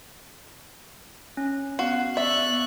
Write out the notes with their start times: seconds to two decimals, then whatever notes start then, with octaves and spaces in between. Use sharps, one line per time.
1.37 C#4
1.79 B3 F#4 F5
2.17 D5 E5 C#6 F#6